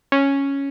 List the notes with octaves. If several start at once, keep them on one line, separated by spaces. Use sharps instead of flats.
C#4